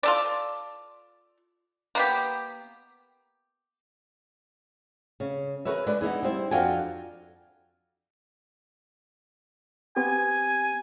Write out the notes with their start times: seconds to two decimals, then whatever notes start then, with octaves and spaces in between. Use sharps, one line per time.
0.03 F4 A4 D5
1.95 A#3 B3 G4
5.20 C#3
5.65 G#4 A#4 B4 C#5 E5
5.86 G#3 D4 B4
6.01 B3 D#4 E4 G#4
6.23 G3 C4 E4
6.51 F2 D4 F4 F#4 G5 G#5
9.96 B3 C4 G4 G#5